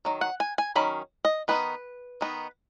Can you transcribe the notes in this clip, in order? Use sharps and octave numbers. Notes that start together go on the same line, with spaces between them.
D#3 F#3
F#5
G#5
G#5
D#3 F#3 C#4 B5
D#5
D#3 B3 D#4 B4
D#3 B3 D#4